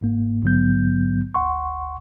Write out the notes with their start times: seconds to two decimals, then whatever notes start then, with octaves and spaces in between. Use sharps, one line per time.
0.01 G1 G#2 A#3
0.42 A#1 G#2 D3 F#3 B3 G6
1.34 G1 D2 F#5 C6 C#6